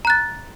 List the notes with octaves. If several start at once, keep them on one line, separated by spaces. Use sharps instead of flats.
A#5 F#6 A6